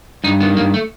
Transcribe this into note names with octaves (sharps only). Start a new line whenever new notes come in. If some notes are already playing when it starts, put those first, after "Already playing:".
G2 D#4
D#3 B3
G2 A#3
A3